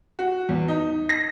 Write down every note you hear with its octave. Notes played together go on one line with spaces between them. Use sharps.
F#4
E2
D#4
A#6